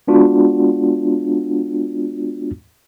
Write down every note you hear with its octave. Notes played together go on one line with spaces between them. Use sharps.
G#3 B3 D4 F4 F#4